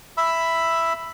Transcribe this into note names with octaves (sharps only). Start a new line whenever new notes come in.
E5 B5 E6